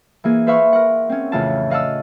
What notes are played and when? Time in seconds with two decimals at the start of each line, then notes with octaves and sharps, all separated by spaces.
0.24 E3 A#3 G#4
0.47 B4 C5 E5 F5 B5 C#6
0.73 A#4 F#5
1.09 C4 C#4
1.32 F2 A2 C#3 E3 F5 A5
1.70 D#5 F5 F#5 A5 E6